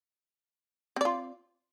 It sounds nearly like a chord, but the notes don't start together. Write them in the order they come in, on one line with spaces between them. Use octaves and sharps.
C4 D5 F4